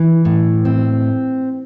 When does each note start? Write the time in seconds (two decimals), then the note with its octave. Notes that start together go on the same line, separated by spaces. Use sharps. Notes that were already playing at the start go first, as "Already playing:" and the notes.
Already playing: E3
0.25 A2
0.65 C4